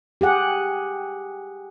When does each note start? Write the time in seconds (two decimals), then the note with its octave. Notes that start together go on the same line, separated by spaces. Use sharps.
0.21 G4 G#4 F#5